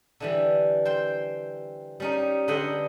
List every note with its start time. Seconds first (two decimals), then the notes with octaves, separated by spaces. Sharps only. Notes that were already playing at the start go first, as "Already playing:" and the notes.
0.20 D3 E3 G3
0.85 C5 G5
2.00 G3 C#4 D#4
2.48 D3 B4 D#5 F#5 G5 C6